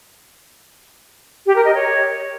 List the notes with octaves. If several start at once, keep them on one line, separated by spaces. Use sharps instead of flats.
G4
A#4
D#5
C#5